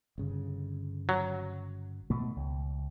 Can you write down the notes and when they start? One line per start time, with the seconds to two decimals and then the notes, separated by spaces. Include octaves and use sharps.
0.18 G1 C#3
1.09 F#3
2.10 B2 A3
2.36 C#2